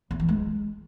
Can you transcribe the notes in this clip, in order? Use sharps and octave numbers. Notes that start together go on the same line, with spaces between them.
E2
E3
G#3